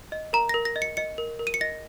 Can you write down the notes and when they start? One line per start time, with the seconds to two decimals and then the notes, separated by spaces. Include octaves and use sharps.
0.12 D#5
0.33 A#4 A#5
0.49 A#4 A#6
0.65 A#6
0.76 D#5
0.82 C#7
0.97 D#5 C#7
1.18 A#4
1.39 A#4
1.47 D#7
1.54 C#7
1.61 D#5 A#6